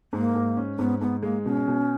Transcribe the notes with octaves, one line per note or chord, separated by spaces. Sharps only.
G#2 A#3
G#2
C#4
G#2 B3
G#2 B3
G#3 A#3
B2 C#4
B2